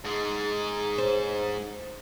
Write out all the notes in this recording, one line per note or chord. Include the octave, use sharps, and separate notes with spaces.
G#2 G#3
C5